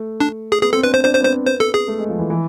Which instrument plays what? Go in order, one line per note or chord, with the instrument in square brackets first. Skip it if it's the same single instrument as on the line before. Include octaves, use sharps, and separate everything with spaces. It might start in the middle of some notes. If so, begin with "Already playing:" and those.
Already playing: [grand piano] A3
[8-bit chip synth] D4
G#4
[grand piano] B3 [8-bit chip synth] G#4
[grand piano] C4 [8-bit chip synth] A4
[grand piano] D4 [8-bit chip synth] B4
[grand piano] C4 [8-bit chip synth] C5
[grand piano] D4 [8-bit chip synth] C5
[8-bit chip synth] C5
[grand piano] B3
[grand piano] C4 [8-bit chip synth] C5
[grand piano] B3 [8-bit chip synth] C5
[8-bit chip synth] A4
G#4
[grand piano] A3
G#3
F3
E3
E3